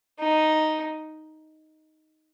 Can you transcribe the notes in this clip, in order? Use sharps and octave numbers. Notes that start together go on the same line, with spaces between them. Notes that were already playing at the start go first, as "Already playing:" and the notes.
D#4